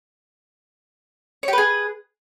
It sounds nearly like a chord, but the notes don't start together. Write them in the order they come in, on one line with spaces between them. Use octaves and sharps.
C#5 G4 B4 G#4